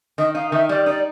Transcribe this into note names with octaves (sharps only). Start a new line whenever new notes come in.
D#3 D#5
D#4 F5
D#3 E5
G3 D5
D#4 D5